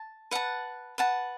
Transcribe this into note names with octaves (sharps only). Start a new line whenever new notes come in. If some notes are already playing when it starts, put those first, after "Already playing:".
Already playing: A5
B4 F#5 A5
B4 F#5 A5